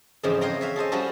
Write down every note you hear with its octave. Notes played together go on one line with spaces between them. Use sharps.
F2 G#2 C#3 E3 F3
C5 C#5 D#5 F5 G5 A#5
C#5 E5 F5
G#4 A4 C5 D#5
F3 G3 C#4 E4 F#4 A4